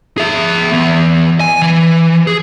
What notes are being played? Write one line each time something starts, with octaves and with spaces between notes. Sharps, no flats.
G#4 E5
E3 B3
G#5
E3
G#4